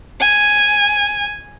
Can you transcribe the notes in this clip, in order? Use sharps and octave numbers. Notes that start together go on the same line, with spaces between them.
G#5